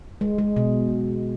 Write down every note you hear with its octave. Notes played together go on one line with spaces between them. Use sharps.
G#3
G#3
B2